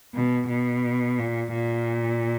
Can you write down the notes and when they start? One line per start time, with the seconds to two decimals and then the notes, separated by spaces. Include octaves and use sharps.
0.14 B2
0.49 B2
1.18 A#2
1.54 A#2